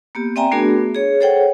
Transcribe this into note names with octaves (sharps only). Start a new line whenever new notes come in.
A#3 B3 G4
C4 D5 E5 G5 G#5 A#5
A3 B3 D4 F#4 G#4 A#4
G#4 C#5
G#4 A4 C5 C#5 F#5 G5